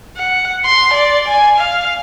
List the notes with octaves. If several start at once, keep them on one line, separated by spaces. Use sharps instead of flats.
F#5
C6
D5
G#5
F5